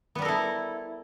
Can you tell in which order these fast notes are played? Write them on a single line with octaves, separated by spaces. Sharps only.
B3 G3 A#4 A4 E4